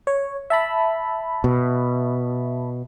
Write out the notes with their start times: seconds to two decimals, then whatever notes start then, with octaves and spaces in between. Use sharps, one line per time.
0.07 C#5
0.50 E5 A5 B5
1.44 B2